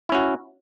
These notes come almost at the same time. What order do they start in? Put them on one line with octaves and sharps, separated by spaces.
E4 C#4 F#4